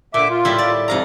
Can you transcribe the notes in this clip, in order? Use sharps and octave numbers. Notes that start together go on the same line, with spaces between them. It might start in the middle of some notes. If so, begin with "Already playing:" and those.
A#2 D3 E5 D6
F4
A2 G3 E4
D5
F2 G#2 C3 F5 A#5